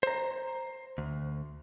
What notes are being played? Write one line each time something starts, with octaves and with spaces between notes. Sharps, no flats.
C5 A#5
D2